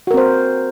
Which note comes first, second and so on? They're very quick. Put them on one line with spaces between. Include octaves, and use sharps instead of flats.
F#4 A#4 C4 C5